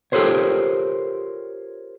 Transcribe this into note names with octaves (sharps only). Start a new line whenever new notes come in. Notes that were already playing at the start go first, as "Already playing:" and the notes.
F4 G4 A4 A#4 C5 C#5